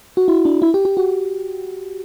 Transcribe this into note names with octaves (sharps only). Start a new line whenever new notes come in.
F#4
E4
D4
E4
G4
G4
F#4